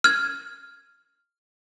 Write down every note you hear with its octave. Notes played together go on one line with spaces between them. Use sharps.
F6 G#6